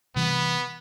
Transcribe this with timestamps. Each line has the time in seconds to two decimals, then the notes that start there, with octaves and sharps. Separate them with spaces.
0.16 C3 E3 G3 B3